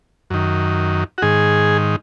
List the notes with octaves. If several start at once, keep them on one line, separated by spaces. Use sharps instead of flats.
F#2 D#3
F#4
G#2 D#3 G#4